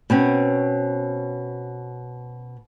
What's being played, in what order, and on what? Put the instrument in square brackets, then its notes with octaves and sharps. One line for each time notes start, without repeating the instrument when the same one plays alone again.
[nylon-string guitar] B2 C4 C#4